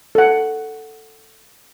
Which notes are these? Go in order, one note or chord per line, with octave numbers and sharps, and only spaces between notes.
A4 F#5